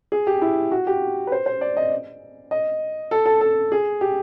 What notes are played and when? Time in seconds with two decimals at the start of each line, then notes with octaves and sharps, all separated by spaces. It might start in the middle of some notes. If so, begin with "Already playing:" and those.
0.12 G#4
0.27 G4
0.42 E4
0.72 F#4
0.87 G4
1.27 B4
1.32 C5
1.46 C5
1.61 D5
1.77 D#5
2.51 D#5
3.11 A4
3.26 A4
3.41 A4
3.72 G#4
4.01 G4